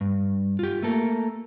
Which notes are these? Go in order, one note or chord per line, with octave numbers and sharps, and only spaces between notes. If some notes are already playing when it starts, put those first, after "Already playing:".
G2
F4 G4
A3 A#3 A4 A#4